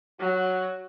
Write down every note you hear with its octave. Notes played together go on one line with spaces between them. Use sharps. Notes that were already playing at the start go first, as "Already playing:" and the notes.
F#3 F#4